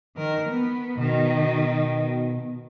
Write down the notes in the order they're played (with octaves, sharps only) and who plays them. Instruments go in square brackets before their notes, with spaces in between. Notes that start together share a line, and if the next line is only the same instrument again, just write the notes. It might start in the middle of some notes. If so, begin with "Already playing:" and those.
[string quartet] D#3 A#4
B3
[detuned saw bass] B2 [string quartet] D#3